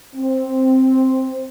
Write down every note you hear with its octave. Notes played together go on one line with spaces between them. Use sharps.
C4